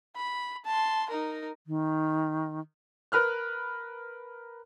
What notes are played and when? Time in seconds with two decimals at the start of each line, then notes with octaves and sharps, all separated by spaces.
0.16 B5
0.65 A5 C6
1.10 D#4 A#4
1.67 D#3
3.12 A#4 B4 F6 F#6